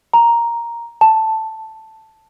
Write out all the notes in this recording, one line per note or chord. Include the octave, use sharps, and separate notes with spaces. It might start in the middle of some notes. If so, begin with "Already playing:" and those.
A#5
A5